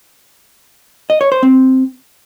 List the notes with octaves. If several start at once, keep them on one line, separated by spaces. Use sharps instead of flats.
D#5
C#5
C5
C4